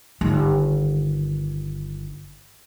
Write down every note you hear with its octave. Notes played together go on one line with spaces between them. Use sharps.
G1 D#3